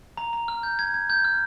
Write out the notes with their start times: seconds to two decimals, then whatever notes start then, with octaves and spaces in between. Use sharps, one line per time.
0.17 A#5
0.33 A#5
0.48 F6
0.63 G6
0.79 G#6
0.94 G#6
1.10 G6
1.24 F6